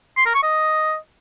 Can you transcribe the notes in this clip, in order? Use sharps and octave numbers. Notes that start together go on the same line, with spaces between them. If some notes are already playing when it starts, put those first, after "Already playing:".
C6
A#4
C#6
D#5